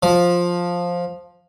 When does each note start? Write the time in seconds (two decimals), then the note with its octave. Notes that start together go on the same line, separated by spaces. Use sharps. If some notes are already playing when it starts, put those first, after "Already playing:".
0.03 F3